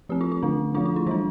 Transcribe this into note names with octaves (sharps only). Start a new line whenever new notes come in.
F3 C4 G4
F4
F4
D3 A3 D4
F3 A3 D4 F4
F4
E4
E3 G3 D4 F4